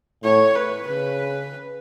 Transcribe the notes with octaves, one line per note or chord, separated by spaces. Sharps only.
A2 C#5
B4
C#3 B4